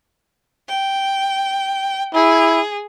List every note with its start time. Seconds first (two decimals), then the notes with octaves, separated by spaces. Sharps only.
0.68 G5
2.14 E4 G#4